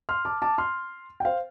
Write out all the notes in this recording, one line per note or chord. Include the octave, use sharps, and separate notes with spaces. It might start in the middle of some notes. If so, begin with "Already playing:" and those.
C6 F6
A5 D6
A5 D6
C6 F6
G5
C5 F5